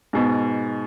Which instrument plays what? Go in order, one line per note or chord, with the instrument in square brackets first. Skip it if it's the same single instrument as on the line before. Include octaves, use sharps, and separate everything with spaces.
[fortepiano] G#2 B2